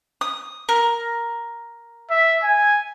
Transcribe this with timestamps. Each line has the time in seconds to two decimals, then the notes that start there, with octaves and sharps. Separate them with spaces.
0.21 D#6
0.69 A#4
2.11 E5
2.44 G#5